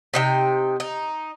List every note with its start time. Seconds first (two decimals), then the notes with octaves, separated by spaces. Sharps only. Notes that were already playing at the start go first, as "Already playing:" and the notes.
0.14 C3 D#4 G5
0.80 D#4